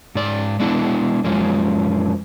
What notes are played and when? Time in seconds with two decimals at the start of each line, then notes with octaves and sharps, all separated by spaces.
0.15 G#2 D5
0.60 G#3 B3 D4 E4
1.24 F#2 F3 G#3 C#4